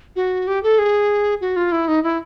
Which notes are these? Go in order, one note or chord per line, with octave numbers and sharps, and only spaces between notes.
F#4
G4
A4
G#4
F#4
F4
E4
D#4
E4